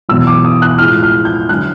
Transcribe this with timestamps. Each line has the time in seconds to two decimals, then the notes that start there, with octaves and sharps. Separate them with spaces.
0.09 E2 B2 F#3 E6
0.27 D6
0.45 D#6
0.62 F#6
0.78 A2 F3 G#3 F6
1.03 F6
1.25 G6
1.49 D3 F#3 F#6